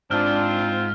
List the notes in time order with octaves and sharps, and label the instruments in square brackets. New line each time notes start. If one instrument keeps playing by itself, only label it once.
[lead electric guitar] G#2 [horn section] C4 F4 [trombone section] D4 [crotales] F6